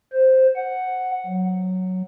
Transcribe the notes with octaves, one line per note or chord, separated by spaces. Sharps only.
C5
F#5
F#3